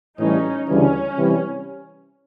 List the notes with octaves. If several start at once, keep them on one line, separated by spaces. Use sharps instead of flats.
A2 E3 G3 C#4 D#4
D2 C#3 E3 G3 C#4
C3 E3 G3